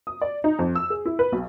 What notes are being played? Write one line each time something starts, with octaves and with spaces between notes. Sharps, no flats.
D#6
D5
D#4
F2
E6
G#4
E4
B4
B1